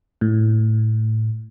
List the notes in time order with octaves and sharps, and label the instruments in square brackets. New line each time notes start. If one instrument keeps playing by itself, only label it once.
[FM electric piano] A2